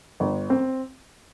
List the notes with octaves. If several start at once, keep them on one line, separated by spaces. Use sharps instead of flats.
G1
C4